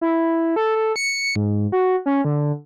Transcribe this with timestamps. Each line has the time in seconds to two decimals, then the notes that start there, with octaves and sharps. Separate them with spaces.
0.01 E4
0.56 A4
0.75 A4
0.96 C#7
1.36 G#2
1.72 F#4
2.06 C#4
2.25 D3